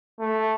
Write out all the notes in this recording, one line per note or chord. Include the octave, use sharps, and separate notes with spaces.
A3